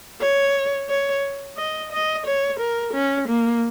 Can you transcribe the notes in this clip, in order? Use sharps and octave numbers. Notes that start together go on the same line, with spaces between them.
C#5
C#5
D#5
D#5
C#5
A#4
C#4
A#3